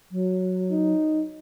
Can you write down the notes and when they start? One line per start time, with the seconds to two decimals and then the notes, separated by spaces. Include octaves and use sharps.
0.12 F#3
0.71 D#4